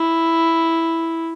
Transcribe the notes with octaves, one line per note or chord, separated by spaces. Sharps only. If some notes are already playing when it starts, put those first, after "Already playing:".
Already playing: E4